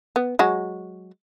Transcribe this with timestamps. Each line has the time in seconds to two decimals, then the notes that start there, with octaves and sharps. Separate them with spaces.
0.16 B3
0.39 F#3 G#3 F#4